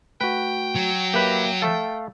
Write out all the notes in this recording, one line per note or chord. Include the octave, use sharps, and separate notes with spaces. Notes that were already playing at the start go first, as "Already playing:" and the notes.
A3 F#4 B4 G5
F#3
A#3 G4 B4 E5 D6
A3 A4 F5